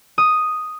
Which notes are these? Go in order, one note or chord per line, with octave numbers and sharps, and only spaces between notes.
D#6